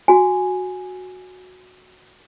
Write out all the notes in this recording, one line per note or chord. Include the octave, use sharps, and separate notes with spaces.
F#4 G#5